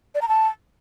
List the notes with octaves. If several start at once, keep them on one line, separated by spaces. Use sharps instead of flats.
D5
A#5
A5